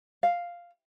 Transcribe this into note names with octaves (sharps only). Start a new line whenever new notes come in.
F5